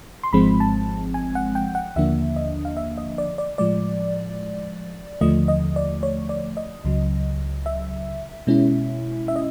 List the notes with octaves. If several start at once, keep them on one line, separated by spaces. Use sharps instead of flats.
C6
G#1 G#2 F3 G#3 C4 B5
A5
G#5
F#5
G5
F#5
D#2 D3 F3 A#3 D4 E5
D#5
F5
E5
D#5
D5
D5
A2 F3 G#3 D5
D#2 D3 F3 A3 D#5
D#5
D5
C#5
D5
D#5
C#2 C#3 F#3
E5
B2 G#3 C#4 E4
E5
D#5